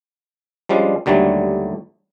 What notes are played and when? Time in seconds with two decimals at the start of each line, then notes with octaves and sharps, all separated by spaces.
0.69 F3 G3 G#3 C#4 D4
1.06 D#2 D3 F#3 G3 A3